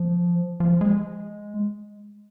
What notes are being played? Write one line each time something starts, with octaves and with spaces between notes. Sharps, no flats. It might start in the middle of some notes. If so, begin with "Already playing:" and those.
Already playing: F3
F3
G#3